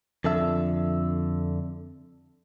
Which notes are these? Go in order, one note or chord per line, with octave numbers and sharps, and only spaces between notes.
F2 D3 A4 E5